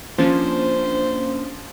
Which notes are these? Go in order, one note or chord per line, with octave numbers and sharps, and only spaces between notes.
F3 A#3 C#4 D4 C5